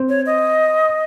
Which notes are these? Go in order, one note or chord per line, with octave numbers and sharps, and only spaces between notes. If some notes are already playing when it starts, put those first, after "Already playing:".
Already playing: C4
C#5
D#5